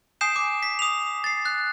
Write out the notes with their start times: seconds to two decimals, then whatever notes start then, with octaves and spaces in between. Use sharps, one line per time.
0.21 G#5 D#6 G6 C7 E7
0.36 D6
0.63 B6
0.79 D#6 F7
1.24 A6 C7
1.45 F#6